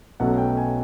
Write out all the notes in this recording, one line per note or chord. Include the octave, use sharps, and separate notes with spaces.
B1 B2 F#3 A3 C#4 F#5
G5
G#5